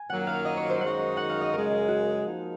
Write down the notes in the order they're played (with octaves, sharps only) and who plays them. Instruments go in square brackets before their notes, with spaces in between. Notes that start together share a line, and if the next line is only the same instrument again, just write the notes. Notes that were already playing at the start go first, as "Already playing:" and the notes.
Already playing: [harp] G#5
[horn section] F#2 D#3 F#3 A#3 F4 [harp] F#5
[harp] F5
D#5
C#5
C5
[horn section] F#2 D#3 G#3 D#4 F#4 [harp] F#5
[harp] F#5
F5
D#5
[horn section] F#2 C#3 G#3 [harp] A#4
[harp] G#4
F#4
[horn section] F3 A#3 D#4